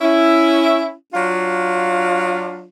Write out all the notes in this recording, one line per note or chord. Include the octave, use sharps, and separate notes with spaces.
C#4 E4
F#3 D4 F4